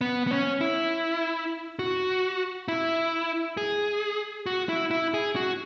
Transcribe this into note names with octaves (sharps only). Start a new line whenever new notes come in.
B3
B3
C#4
E4
F#4
E4
G#4
F#4
E4
E4
G#4
F#4